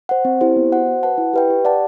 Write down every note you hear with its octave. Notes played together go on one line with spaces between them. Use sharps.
C5 F#5
C4
E4 G4 C5
B3
F#4 C5 F#5
F#4
B4 F#5 A5
E4
G4 B4 E5 G5
G4
D5 F#5 A5